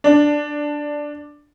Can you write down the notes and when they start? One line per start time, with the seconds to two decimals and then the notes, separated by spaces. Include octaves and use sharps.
0.04 D4